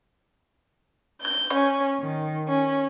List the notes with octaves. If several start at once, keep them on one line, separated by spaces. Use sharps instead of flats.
G6
C#4
D#3
C#4